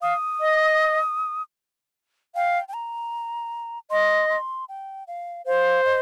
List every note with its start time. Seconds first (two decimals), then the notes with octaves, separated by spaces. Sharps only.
0.02 F5 D#6
0.41 D#5
2.35 F5 G5
2.68 G5
2.74 A#5
3.90 D#5 C6
4.30 C6
4.69 G5
5.07 F5
5.46 C5 F5
5.85 D#5